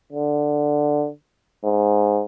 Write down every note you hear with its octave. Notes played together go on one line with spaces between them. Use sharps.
D3
G#2